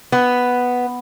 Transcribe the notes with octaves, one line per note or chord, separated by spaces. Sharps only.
B3